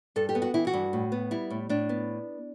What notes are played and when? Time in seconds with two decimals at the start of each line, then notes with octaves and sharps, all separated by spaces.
0.16 G2 A4
0.29 G4
0.35 B3
0.42 F#4
0.54 E3 E4
0.67 F#4
0.74 G2
0.93 A2
1.12 B3
1.31 G3 E4
1.50 A2
1.69 A2 D4
1.89 B3